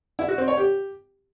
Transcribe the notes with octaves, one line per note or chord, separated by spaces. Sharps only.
E4
F#4
C4
C#5
G4